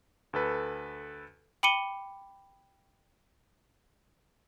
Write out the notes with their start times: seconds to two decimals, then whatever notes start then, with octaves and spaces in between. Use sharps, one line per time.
0.33 D2 A4 B4
1.63 G5 B5 D6 C#7 D#7 G7